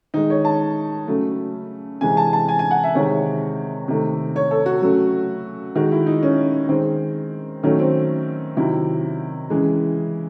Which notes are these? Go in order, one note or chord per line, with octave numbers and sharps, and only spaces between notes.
D#3 G#3 D#4
C#5
A5
C#3 F#3 A3
C3 E3 G#3 G#5
A5
A5
G#5
G#5
F#5
E5
C3 D#3 G#3 C#5
C3 D#3 A3
C#5
A4
F#4
C#3 F#3 A3
D#3 G#3 F#4
E4
D#4
C#4
D#3 G#3 C4
D#3 F#3 A3 C#4
C4
C3 D#3 F#3 E4
C#3 E3 G#3